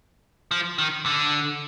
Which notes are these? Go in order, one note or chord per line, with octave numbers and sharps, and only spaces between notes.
F3
D#3
D3